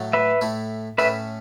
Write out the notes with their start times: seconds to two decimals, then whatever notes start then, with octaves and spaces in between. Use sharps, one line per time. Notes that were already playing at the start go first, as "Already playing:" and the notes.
Already playing: A2 F#3 A3
0.13 B4 E5
0.41 A2 A3 E4
0.98 A2 A3 C#4 B4 E5